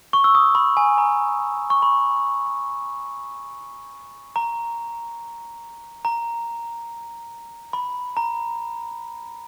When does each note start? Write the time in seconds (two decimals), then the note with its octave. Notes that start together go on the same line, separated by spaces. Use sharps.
0.13 C#6
0.24 E6
0.35 D#6
0.55 B5
0.77 G#5
0.98 A#5
1.70 C#6
1.82 B5
4.36 A#5
6.05 A#5
7.73 B5
8.17 A#5